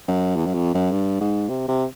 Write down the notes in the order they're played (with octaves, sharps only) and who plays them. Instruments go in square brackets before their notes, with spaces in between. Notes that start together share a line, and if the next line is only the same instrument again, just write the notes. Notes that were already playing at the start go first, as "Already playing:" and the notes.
[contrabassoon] F#2
E2
F#2
F2
F#2
G2
G#2
C3
C3